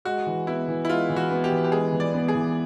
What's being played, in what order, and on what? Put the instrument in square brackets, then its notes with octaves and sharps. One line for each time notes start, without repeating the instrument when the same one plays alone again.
[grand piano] G#3 [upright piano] F#4
[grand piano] E3
[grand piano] B3 [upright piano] E4
[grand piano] E3
[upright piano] E4
[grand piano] G#3 [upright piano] F4
[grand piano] E3
[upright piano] F#4
[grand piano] B3
[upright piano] G4
[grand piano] E3
[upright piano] G4
[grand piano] G#3 [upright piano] G#4
[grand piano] E3
[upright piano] D5
[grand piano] B3
[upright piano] G#4
[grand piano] E3